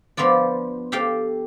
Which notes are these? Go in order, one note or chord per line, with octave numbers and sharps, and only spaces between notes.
F3 B3 D4 F4 D5
G4 A4 F5 G5